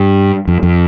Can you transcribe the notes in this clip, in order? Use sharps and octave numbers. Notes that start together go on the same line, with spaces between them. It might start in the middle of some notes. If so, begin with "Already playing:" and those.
Already playing: G2
F2
F2